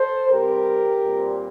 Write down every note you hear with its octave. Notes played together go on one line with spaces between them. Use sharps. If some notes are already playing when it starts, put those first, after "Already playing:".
Already playing: A4 C5
C3 G3 C4 G4 A#4
A#2 G3 C4